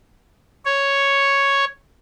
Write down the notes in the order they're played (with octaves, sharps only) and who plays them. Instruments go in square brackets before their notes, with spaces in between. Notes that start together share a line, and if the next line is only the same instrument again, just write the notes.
[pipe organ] C#5